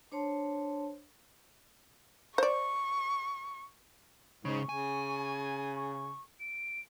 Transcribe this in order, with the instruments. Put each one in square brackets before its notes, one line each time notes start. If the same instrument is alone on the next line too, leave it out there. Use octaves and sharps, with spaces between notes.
[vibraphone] D4 C5 C#5 A5 C6
[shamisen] C5 D5 [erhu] C#6
[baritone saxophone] G#2 [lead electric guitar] C#3 [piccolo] C#6
[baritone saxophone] C#3 [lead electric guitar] G#5
[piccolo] C#6
D7